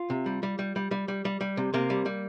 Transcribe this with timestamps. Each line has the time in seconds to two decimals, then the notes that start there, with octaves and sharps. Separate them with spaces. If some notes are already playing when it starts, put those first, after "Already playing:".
Already playing: F4
0.10 C3
0.26 G3
0.43 G3
0.59 G3
0.76 G3
0.91 G3
1.08 G3
1.25 G3
1.41 G3
1.57 C3
1.74 C3 A#3
1.90 G3
2.06 G3